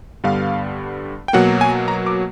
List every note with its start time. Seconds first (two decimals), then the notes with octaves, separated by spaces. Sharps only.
0.24 G2 D3 G3 B3 F5
1.28 G5
1.33 B2 F#3 A#3 F#5
1.61 G#5
1.88 A#5
2.07 D6